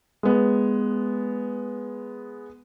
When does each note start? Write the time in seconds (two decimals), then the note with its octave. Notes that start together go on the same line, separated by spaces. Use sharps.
0.23 G#3 B3